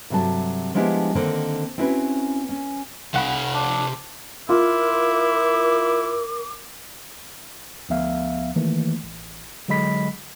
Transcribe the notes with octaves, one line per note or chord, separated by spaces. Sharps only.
G2 C3 F#3 A3 A5
F3 G#3 B3 D4 E4 G4
D3 D#3 A#3 C4 C5
C4 C#4 E4 F#4 A#4 B4
C#4
C2 C3 F5 F#5 B5
D4
E4 F4 A#4 D6
D2 F3 B3 E5 F5
D#3 E3 A3 A#3
A1
D3 F#3 G#3 D#5 B5 B6